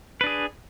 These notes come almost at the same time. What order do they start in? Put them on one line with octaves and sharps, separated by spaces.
B4 D4 G#4